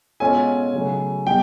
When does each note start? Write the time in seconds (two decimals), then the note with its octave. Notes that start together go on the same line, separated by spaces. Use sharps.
0.20 B2 G#3 C#4 F4 A4 G#5
0.73 C#3 F#3 A3
1.26 B2 G3 G5